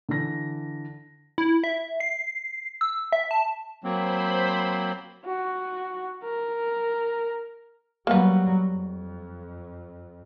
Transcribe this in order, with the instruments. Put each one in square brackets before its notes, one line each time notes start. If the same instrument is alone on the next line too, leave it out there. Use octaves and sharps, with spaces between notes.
[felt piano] D3 E3 A#6
[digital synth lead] E4
E5
C7
E6
E5
A5
[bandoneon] F#3 A#3 C4 [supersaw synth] C5 B5
[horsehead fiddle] F#4
A#4
[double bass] F#3 G3 [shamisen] A#3 B3
[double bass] F2